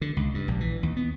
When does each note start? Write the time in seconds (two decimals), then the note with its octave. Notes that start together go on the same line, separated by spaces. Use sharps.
0.01 D3
0.17 C#2
0.34 G2
0.48 A#1
0.60 E3
0.83 D#2
0.97 B3